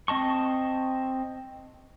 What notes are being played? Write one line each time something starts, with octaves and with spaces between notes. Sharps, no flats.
C4 D#5 A5 C#6